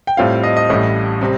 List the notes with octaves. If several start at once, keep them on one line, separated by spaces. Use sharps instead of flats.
G5
A2 G3 C4 F4 F5
D#5
D#5
A1 A2 G3
C3 G3 C4